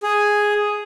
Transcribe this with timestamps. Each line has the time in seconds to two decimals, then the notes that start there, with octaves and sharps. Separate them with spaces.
0.03 G#4